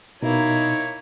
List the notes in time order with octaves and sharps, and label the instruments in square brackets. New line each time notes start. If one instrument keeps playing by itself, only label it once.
[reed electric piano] B2 [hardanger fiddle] A#3 E4 [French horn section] D#4 [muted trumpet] C#5